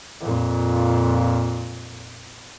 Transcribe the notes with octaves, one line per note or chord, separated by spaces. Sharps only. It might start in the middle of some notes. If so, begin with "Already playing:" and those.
F2 A#2